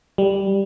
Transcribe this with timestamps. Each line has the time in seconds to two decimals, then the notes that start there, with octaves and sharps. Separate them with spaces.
0.18 G3